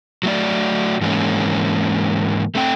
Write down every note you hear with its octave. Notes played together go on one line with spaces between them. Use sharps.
F#3 A3 D5
G#2 E3 F#3 G#3 A#3 C#4
A3 C4 G5